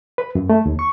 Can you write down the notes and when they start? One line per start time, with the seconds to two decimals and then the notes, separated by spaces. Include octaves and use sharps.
0.18 B4
0.35 F#2
0.50 A3
0.66 D#2
0.79 C#6